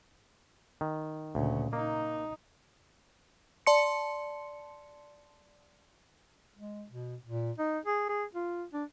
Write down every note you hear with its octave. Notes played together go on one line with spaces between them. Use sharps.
D#3
D2 A#2 C#3
A#3 D#4
D5 A5 C6 C#7
G#3
B2
A#2
D#4
G#4
G#4
F4
D4